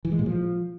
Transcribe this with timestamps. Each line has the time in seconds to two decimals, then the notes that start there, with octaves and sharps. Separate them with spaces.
0.05 E3
0.12 G#3
0.19 A#2
0.26 F3